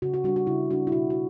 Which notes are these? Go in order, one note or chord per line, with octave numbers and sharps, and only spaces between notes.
C#3 F#4
F#4
G3 D4 F#4
F#4
C#3 E4
G3 D4 F#4
E4
B2 F#4
F#4